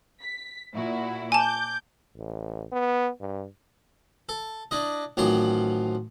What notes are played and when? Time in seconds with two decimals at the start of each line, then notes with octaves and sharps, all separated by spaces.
0.21 B6
0.72 A#2 E4 F#4
1.32 G#5 A5 D6 G6
2.16 A1
2.72 B3
3.20 G2
4.29 A4
4.71 D4 E4 D#5
5.17 A1 D#3 F3 F#3 C4 C6